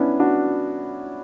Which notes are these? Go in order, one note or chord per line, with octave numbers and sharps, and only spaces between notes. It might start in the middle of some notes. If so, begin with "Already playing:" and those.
Already playing: B3 C#4 D4 E4
D4 F#4